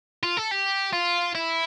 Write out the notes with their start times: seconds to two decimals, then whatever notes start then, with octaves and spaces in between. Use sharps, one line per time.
0.23 F4
0.37 A4
0.51 G4
0.93 F4
1.35 E4